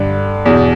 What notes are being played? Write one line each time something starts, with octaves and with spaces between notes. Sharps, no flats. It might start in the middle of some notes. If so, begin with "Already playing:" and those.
Already playing: G2 D3
E2 B2